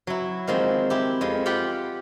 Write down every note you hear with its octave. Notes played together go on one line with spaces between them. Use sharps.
F#3 E4
D#3 F3 G#3 A#3 C4
E4 G4
F2 F3 G#3
F4 G4 F#5 G5 B5